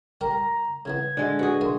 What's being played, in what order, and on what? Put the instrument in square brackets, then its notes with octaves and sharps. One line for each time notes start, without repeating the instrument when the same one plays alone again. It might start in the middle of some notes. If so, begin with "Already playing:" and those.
[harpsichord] G3 G4 A#4 [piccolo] A#5
[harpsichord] C#3 E3 B3 [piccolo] G#6
[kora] D3 G#3
[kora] F#4 G#4 [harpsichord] B4
[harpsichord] B1 A#3 G#5 [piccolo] C6